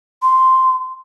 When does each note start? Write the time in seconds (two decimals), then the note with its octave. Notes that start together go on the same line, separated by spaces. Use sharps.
0.22 C6